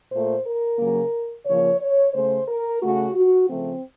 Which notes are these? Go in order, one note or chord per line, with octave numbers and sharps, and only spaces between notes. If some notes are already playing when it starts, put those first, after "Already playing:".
A#2 A3 C5
A#4
C#3 F#3 A#3
C#3 F3 A#3 C#5
C#5
C#3 A3 C5
A#4
C#3 A3 F#4
F#4
C#3 F3 A3 C4